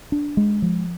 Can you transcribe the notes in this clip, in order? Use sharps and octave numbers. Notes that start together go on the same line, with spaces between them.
D4
G#3
F3